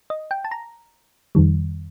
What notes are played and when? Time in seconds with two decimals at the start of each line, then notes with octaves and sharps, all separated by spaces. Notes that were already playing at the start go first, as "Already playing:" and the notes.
0.10 D#5
0.31 G5
0.45 A5
0.51 A#5
1.35 F2 D#3 G3